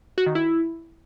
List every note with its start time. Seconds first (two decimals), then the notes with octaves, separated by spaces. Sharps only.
0.18 F#4
0.26 D#3
0.35 E4